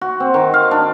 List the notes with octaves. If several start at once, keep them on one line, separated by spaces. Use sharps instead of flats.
F#4
C4
D#3
F5
D4